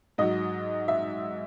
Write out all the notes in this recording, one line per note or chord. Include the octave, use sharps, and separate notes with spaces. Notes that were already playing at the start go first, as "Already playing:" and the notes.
G#2 F#3 D#5
E5